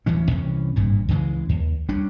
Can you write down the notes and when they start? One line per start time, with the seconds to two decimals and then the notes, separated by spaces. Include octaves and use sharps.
0.06 D1 D2 E3 C#4
0.31 C2 C3 E3 C#4
0.76 G#1 G2 A#2
1.09 C#2 C#3 E3 G#3
1.49 D#2
1.89 G3 C#4 D4